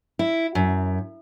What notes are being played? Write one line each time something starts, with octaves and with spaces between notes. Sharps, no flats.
E4
F#2